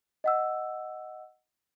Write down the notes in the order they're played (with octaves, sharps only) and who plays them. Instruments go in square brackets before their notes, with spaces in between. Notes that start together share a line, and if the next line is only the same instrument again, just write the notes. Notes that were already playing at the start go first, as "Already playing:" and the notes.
[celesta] D#5 F#5 E6